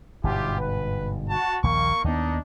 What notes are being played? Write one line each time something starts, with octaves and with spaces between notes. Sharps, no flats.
G1 G#2 B2 E4 F4 G4
B4
F#4 A5
A#1 D#2 A#3 C#6
D#2 B3 D4 D#4